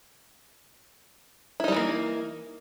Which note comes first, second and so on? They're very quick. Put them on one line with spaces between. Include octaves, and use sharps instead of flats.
E4 D#4 G3 E3 A#3